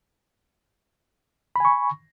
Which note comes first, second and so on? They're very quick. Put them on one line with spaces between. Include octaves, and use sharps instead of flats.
B5 G#5 C#6